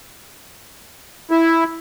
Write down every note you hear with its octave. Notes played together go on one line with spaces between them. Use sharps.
E4